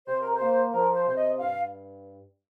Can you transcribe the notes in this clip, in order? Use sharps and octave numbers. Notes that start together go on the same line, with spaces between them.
C3 C5
A#4
C5
A#3
F3 A#4
C5
C3 C5
D#5
G2 F5